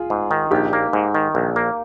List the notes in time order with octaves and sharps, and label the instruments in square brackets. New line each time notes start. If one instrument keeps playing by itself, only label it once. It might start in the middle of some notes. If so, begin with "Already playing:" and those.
Already playing: [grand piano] F4 G#4
[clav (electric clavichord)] G#2
D#3
[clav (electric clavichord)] A#1 [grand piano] D#4 G4
[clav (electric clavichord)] A#3
G#2
D#3
A#1
A#3